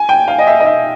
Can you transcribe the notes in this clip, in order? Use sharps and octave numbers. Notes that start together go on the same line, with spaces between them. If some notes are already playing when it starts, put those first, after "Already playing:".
Already playing: G#5
G5
F5
D#5
E5
D#5
E5